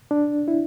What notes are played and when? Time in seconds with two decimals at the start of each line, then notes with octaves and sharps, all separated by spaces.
0.11 D4
0.48 E4